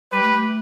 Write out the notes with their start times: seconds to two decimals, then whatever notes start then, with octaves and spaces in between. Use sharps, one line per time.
0.12 G3 G4 B4
0.22 A3
0.33 A3